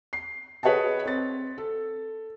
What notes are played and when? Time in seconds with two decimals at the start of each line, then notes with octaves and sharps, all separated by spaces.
0.13 C7
0.63 G#4 B4 C#5 D#5 F#5 A5
1.05 C4 A6
1.58 A4